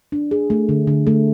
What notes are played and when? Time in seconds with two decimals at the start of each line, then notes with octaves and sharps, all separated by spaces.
0.12 D4
0.31 G#4
0.50 A3
0.69 D3
0.87 D3
1.07 A3